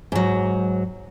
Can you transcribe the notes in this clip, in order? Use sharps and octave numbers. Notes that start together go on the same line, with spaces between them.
G#2 F#3